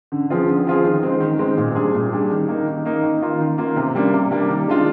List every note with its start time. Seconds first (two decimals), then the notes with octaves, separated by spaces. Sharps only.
0.12 D3
0.30 F3 C4 F4 G#4
0.48 D3
0.66 F3 C4 F4 G#4
0.84 D#3
1.03 G#3 C4
1.20 D#3
1.39 G#3 C4
1.57 A#2
1.75 G3 D4 G#4
1.94 A#2
2.13 G3 D4 G#4
2.31 D#3
2.49 A#3 D#4
2.67 D#3
2.85 A#3 D#4
3.03 D#3
3.22 A#3 F4
3.39 D#3
3.58 A#3 F4
3.76 C3
3.95 G3 A#3 D4
4.13 C3
4.31 G3 A#3 D4
4.49 D#3
4.68 G#3 D4 F4